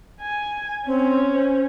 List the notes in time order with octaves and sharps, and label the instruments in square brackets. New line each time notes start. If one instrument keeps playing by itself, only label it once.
[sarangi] G#5
[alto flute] C4 [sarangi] C#4
[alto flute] C5